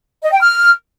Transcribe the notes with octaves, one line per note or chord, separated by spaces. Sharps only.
D#5
G5
F6